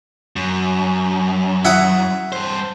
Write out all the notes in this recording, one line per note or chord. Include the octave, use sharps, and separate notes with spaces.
F#2
E4 F#5 D#6
G2 C5